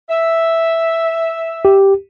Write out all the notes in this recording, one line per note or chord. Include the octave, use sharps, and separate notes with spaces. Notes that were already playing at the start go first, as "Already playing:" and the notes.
E5
G4